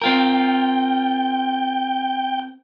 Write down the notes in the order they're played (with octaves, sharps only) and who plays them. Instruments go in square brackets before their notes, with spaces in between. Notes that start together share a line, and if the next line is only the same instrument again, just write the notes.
[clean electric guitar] C4 F4 A#4 [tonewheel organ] G5